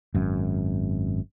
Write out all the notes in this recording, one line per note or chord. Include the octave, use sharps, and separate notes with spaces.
G#1 F#2